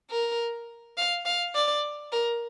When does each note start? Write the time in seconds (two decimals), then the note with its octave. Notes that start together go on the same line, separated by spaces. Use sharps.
0.11 A#4
0.97 F5
1.25 F5
1.55 D5
2.12 A#4